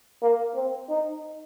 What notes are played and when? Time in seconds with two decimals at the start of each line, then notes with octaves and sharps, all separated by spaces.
0.22 A#3
0.55 C4
0.89 D#4